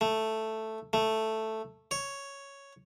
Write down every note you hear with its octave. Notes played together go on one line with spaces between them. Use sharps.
A3
A3
C#5